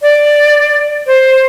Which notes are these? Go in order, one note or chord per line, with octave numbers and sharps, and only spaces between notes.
D5
C5